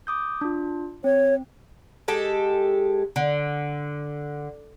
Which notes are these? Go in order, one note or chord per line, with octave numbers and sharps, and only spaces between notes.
D6 D#6 G6
D4 F4
C4 C#5
G#3 G4 A4
D3